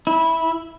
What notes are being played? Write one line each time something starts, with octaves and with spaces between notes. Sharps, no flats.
E4